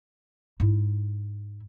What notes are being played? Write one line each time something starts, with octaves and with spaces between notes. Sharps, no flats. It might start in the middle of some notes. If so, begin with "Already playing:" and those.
G#2 E4